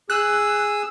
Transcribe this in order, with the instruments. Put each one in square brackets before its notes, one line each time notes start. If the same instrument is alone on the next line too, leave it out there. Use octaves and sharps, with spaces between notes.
[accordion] G#4 D#6 E6 [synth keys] F#6